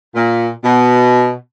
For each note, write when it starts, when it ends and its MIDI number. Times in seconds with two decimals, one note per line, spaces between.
0.15 0.49 46
0.63 1.33 47